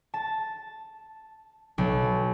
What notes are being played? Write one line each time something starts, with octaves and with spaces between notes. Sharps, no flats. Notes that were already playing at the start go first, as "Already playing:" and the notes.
A5
B1